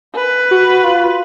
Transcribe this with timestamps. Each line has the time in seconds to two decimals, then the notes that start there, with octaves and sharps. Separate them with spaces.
0.15 B4
0.51 F#4
0.84 F4